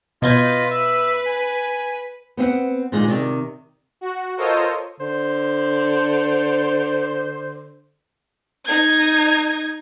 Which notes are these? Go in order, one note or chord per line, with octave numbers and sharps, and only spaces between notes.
B2 F4 B4 D#5 G6 G#6
E5
G#5
B3 C4 D#5 F#5
A#2 D3 D#3 G#3 A#3
C3 D#3 D5
F#4
F4 A4 A#4 C5 C#5 D#5
D3 C5
D#4 G#6